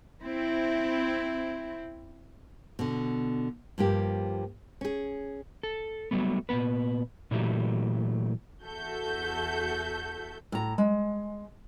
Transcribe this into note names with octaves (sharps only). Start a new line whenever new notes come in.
C4 E4
B2 D3
G2 F3 A#3 G4
C#4 G#4
A4
F#3 G3 A3 B3
A#2 C#3 B3 B4
A#2 E3 F#3 A3 G4
E2 F#4 A4 E5 G6
A2 A#5
G#3